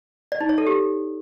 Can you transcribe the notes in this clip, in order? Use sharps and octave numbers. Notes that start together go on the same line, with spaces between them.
D5
D#4
C#5
A4
G4